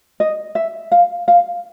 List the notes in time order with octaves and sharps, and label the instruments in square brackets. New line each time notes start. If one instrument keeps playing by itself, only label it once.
[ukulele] D#5
E5
F5
F5